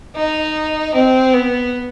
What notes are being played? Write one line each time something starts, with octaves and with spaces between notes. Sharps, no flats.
D#4
C4
B3